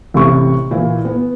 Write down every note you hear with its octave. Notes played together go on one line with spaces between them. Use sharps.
A1 C3 C#6
A#2 E3
B3